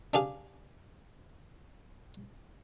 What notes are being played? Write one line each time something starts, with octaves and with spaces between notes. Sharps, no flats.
D4 G4 G#4 F5